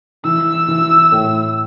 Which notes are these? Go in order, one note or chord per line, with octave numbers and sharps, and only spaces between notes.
E3 E6
E3
A2